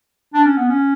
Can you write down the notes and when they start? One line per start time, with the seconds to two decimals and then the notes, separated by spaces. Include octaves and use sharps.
0.34 D4
0.45 C#4
0.57 B3
0.69 C#4